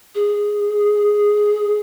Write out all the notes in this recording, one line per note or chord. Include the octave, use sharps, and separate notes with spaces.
G#4